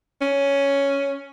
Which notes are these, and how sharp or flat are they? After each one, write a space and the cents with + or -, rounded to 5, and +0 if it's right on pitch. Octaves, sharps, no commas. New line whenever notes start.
C#4 +5